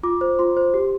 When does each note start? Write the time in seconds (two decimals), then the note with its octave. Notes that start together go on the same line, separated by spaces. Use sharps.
0.03 F4 D6
0.21 C5
0.39 F4 C6
0.57 C5
0.74 G4